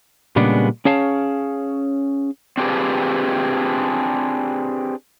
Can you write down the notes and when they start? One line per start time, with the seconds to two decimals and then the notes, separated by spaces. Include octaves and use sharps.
0.36 A#2 C#3 G3 G#3 B3 D4
0.85 C#4 G#4 C#5 F5 A5
2.57 C4 D4 F4 G4 G#4 B4